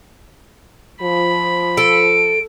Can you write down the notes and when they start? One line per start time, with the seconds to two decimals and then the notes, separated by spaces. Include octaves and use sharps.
1.02 F3 B5
1.77 A4 D7